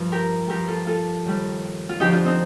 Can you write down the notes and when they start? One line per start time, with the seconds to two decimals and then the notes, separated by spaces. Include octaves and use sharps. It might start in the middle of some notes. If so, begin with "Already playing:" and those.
Already playing: G2 F3
0.12 G4 A#4
0.49 G2 F3 G4 A#4
0.68 F4 A4
0.87 F4 A4
1.25 D#2 D#3 G3
1.89 F4
2.00 F2 D3 F3 D#4 G4
2.13 D4 F4
2.25 C4 D#4